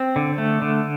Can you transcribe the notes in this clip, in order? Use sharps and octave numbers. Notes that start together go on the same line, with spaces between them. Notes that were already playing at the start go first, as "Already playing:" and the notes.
Already playing: C4
D3
A3
D3